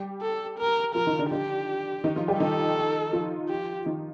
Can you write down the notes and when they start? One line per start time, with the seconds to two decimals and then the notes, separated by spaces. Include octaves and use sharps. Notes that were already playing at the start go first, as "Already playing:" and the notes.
Already playing: G3 G4
0.21 A4
0.59 A#4
0.95 F3 F4 A#4
1.07 D#3 D#4
1.19 D3 D4
1.31 D3 D4 G4
2.04 D#3 D#4
2.16 F3 F4
2.28 G3 G4
2.40 D#3 D#4 A4
3.13 F3 F4
3.49 G4
3.86 D#3 D#4